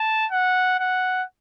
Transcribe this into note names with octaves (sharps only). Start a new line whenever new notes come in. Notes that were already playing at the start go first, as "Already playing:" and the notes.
Already playing: A5
F#5
F#5